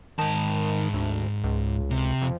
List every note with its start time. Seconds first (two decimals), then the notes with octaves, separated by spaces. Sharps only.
0.19 G#2 D#3 A5
0.93 D2
1.44 C#2
1.91 C3
2.22 F2